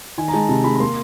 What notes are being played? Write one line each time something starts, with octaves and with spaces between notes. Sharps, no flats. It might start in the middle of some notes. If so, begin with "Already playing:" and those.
D#3 G#5
A#5
G#3 A5
C3 A5
G#3 B5
B5
A#3 C6